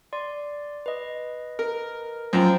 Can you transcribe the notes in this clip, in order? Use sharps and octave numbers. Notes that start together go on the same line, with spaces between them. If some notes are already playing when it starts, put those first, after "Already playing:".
D5 C6
B4 D#5
A#4
F#2 F3 C5 G5